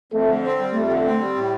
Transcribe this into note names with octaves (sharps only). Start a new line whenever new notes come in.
F2 A3
D3
C4
G3
F2 A3
D3
C4
G3
A2